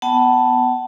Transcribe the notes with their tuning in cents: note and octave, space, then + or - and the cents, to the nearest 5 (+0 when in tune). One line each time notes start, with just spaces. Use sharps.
B3 +0 F#5 +35 A5 +0